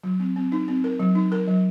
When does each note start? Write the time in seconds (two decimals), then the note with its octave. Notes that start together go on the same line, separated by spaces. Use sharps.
0.03 F#3
0.20 C4
0.36 C4
0.52 D#4
0.68 C4
0.84 A#4
1.00 F#3
1.15 D#4
1.32 A#4
1.48 F#3